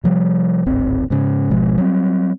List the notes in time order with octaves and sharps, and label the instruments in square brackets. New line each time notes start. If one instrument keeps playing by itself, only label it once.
[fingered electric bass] C3 F3 G3
D1 G#1 C4
G#2 C#3
G#1 B2 F3 G#3
F#3 G3 B3 C4